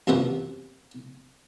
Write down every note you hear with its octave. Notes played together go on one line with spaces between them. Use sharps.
F#2 C3 F3 B3 F#5